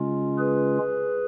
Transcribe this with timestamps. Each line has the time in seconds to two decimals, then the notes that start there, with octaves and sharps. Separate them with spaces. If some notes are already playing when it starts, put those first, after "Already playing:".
Already playing: C#3 G#3 C#4 F4
0.38 G#4 B4